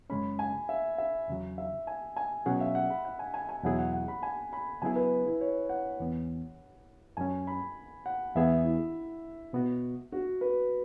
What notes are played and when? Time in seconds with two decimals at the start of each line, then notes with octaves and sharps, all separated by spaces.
0.10 F#2 C#3 G#3 C#4 B5
0.39 G#5
0.69 E5
0.98 E5
1.28 E2 C#3 F#3
1.58 E5
1.87 G#5
2.17 G#5
2.46 B2 F#3 C#4 G#4 F#5
2.61 E5
2.75 F#5
2.90 B5
3.05 F#5
3.19 G#5
3.34 G#5
3.49 G#5
3.64 E2 B2 F#3 E4 G#4 F#5
3.79 F#5
3.93 F#5
4.08 B5
4.23 G#5
4.53 B5
4.82 C#3 F#3 B3 E4 G#4 G#5
4.96 B4
5.26 E4
5.41 C#5
5.69 F#5
6.00 E2 E3 B3
7.17 F#2 F#3 C#4 G#5
7.47 B5
8.06 F#5
8.35 E2 E3 B3 G#4 E5
8.65 E4
9.53 B2 B3 F#4
10.12 F#4
10.41 B4